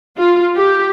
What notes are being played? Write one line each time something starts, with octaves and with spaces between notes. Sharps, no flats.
F4
G4